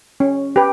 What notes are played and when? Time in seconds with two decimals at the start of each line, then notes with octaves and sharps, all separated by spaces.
0.20 C#4
0.56 G4 B4